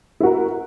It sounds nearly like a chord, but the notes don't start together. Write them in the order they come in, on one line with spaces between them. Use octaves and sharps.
E4 F#4 A#4